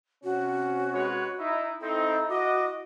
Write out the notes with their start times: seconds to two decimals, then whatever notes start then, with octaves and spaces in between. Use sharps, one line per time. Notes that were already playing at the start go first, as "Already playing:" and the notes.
0.24 C3 C#4 F#4
0.92 G#3 B4 C#5
1.38 D#4 E4
1.81 C4 D#4 E4 A4
2.29 F#4 D#5 D6